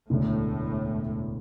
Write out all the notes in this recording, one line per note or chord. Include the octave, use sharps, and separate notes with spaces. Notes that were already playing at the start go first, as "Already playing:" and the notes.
E1 D2 A2 D3 A3